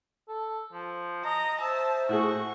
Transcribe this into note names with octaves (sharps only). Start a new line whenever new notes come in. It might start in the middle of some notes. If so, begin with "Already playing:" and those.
A4
F3
D#5 A#5
C5 E5 A5
A2 F#4 G#4 C#6